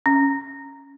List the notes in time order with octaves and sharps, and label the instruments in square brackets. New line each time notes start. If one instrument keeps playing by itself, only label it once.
[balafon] C#4